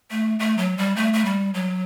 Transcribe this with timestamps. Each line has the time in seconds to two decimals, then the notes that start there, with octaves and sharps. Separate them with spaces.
0.11 A3
0.39 A3
0.58 F#3
0.78 G3
0.96 A3
1.13 A3
1.25 G3
1.54 F#3